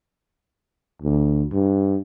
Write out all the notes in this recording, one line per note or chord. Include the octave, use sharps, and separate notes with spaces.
D2
G2